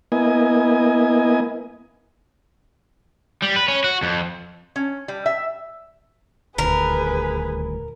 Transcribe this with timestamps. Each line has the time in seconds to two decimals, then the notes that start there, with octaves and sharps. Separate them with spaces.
0.12 A#3 B3 E4 D#5 G#5
3.42 G3
3.56 B4
3.68 C#4
3.84 F#4
4.02 F2
4.76 C#4
5.08 G3
5.26 E5
6.58 D#1 D2 G#4 A#4 B4